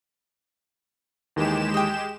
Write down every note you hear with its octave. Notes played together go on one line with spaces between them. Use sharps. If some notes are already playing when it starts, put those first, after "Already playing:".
D#2 D#3 E3 G#3 G4 E7
D#5 G5